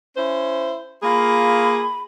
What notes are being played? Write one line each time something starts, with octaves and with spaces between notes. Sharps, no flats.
C#4 E4 C5
A#3 F4 G#4 B5